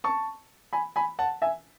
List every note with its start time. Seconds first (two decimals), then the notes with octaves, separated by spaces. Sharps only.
0.04 A5 C#6
0.73 G#5 B5
0.96 G#5 B5
1.19 F#5 A5
1.42 E5 G#5